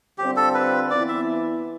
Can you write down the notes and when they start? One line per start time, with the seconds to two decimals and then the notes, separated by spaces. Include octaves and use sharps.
0.18 D3 G3 C4 F4 G4
0.36 A4
0.54 B4
0.90 E3 B3 E4 D5
1.08 E5